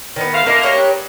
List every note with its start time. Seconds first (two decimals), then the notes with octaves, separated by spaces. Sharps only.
0.16 D#3 B3
0.33 G#2 A3 F5
0.46 D3 A3 A#3 D#4
0.63 G4 A#4 C#5
0.77 G2